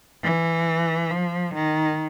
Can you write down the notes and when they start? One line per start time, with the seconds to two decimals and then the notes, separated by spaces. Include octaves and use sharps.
0.23 E3
1.11 F3
1.54 D#3